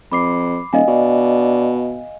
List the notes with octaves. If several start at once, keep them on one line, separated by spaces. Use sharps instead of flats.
F2 B5 D6 C7
D#1 D#5 F5 G#5
B2 D4